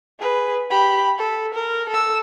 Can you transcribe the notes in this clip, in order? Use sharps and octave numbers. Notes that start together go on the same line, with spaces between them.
G#4 B4
G4 B5
A4
A#4
A4 E6